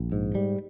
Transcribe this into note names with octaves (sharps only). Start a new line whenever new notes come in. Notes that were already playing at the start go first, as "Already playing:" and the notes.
Already playing: A#1
G#2
G3